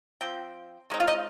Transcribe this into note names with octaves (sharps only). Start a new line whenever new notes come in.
F3 C4 G5
D#3 G#3 C4 D#4
F4 F5
D#4 D#5